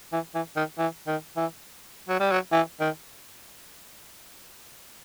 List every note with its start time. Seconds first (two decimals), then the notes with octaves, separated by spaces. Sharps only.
0.13 E3
0.35 E3
0.57 D#3
0.78 E3
1.07 D#3
1.37 E3
2.09 F#3
2.20 G3
2.32 F#3
2.52 E3
2.80 D#3